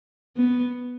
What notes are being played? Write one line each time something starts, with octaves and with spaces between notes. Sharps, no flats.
B3